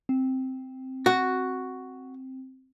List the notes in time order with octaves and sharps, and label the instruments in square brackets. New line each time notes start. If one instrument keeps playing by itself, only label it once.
[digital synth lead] C4
[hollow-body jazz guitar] F#4